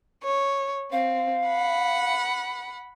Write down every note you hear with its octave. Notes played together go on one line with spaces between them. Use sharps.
C#5
C4 F5
F#5 B5